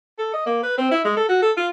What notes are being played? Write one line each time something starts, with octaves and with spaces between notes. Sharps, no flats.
A4
D#5
A#3
B4
C4
E4
G#3
A4
F#4
A4
F4